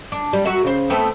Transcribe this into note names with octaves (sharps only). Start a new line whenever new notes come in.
D4
G3
F#4 A#4 E5
C#3 C5
A3 B3 C4